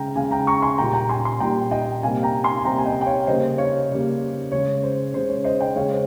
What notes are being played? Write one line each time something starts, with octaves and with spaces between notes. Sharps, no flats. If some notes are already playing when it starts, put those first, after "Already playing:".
Already playing: C#3 G#3 G5 A#5
C#3 G#3 F5 G#5
G5 A#5
A#5 C#6
G#5 C6
A#2 G3 A#3 G5 A#5
G5 A#5
G#5 C6
G#5 C6
A#2 G3 A#3 G5 A#5
D#5 G5
C3 G3 A#3 F5 G#5
G5 A#5
G#5 C6
G#5
C3 G3 A#3 G5 A#5
G#5
D#5 G5
G5
C#5 F5
C#3 G3 A#3 C5 D#5
C#5 F5
C#3 G3 A#3
C#3 G#3 C#5
C5
C#3 G#3 C5
C#5
C5 D#5
D#5 G5
C#3 G#3 C#5 F5
C5